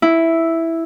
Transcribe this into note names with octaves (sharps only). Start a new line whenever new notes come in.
E4